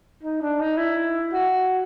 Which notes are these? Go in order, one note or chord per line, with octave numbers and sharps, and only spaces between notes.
D#4
D4
D#4
E4
F#4